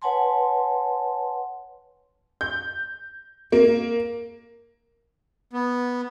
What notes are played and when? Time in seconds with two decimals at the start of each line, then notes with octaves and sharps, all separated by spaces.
0.02 B4 C#5 F#5 G#5 A5 C6
2.41 G6
3.52 A#3
5.53 B3